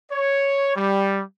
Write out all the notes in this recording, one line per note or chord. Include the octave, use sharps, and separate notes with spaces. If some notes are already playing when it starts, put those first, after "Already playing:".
C#5
G3